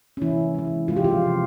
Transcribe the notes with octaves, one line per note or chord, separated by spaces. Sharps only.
C#4
C3 E3 A#3 E4
E3 G#3
C3 F3 G#3 F4
G4
F3 F4
C3 E3 G#3